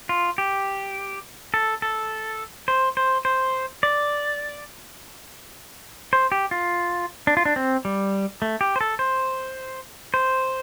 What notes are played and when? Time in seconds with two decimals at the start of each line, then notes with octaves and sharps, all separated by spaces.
0.09 F4
0.38 G4
1.54 A4
1.82 A4
2.68 C5
2.97 C5
3.25 C5
3.83 D5
6.13 C5
6.32 G4
6.51 F4
7.27 D4
7.37 F4
7.45 D4
7.56 C4
7.85 G3
8.42 A3
8.61 G4
8.76 C5
8.81 A4
8.99 C5
10.14 C5